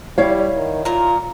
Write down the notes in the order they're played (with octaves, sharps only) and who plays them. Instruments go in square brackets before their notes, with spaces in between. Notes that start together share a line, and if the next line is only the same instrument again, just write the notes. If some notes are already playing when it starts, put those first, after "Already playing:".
[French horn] G3 [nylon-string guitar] E4 C#5 F5
[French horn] D#3
[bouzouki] A#2 A#4 [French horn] F4